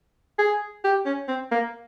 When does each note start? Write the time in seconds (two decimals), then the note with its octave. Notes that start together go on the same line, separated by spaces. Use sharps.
0.39 G#4
0.84 G4
1.06 C#4
1.28 C4
1.51 A#3